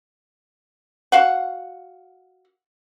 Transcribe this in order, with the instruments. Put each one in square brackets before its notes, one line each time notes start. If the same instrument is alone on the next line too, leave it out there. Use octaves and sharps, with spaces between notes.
[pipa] F#4 F5 F#5